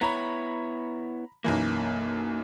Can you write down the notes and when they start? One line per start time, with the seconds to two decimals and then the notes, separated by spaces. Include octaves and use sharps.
0.01 B3 E4 C#5 A#5 B5
1.44 B1 F#2 E3 A#3